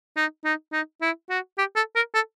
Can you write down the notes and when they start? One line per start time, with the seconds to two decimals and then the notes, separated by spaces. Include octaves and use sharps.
0.17 D#4
0.45 D#4
0.72 D#4
1.02 E4
1.30 F#4
1.58 G4
1.76 A4
1.96 A#4
2.14 A4